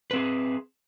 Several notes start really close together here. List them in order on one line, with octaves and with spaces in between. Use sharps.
B4 C4 G#4